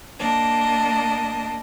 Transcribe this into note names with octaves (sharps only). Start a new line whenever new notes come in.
A#3 D4 D#5